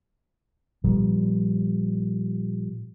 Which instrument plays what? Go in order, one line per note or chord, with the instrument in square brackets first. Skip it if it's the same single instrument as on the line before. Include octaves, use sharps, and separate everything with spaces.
[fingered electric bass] A#2 F3 G3